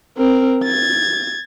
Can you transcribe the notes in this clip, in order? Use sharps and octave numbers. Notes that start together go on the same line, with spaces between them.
C4 A#4
G#6 A6